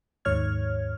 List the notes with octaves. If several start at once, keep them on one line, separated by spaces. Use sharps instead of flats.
D#2 G#2 C#5 F6 G#6